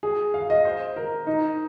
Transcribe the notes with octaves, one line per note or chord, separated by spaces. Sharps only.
G#4
F5
D#5
C5
A#4
D#4